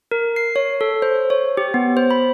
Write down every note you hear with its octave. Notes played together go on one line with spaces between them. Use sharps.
A#4
C7
C#5
A4
C5
C#5
G4
B3
C5
B5